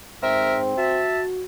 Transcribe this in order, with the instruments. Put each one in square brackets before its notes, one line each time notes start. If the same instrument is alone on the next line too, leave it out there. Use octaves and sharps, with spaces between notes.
[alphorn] G#2 [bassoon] C4 [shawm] A#4 [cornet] E5
[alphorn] F#4 [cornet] E5 [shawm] A5